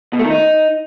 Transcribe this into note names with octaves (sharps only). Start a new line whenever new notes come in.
B2
A3
D#3
D#4